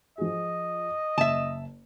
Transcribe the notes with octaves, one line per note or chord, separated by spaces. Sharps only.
F3 G#4 D#5
F#1 E5 A5